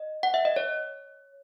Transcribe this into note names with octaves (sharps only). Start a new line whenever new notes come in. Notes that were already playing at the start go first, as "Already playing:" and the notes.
Already playing: D#5
F#5
E5
D#5
C#5